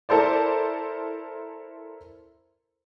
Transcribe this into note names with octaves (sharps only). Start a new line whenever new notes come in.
E4 A4 A#4 C5 D5